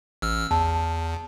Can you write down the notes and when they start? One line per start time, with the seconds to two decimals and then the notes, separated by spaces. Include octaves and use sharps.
0.22 A1 E6 F6
0.51 E2 A5